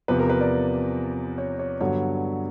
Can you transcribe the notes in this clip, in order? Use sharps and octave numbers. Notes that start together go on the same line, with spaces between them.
E2 C3 F3 B4
A#4
B4
D5
C#5
C#5
G2 D3 F#3 B3 C#5